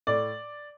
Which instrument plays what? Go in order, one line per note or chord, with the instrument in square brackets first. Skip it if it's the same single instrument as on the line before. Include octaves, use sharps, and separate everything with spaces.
[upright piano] A2 D5